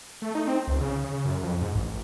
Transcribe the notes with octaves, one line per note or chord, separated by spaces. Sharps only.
A3
D#4
C4
C#2
C#3
C#3
F#2
F2
G#2
A1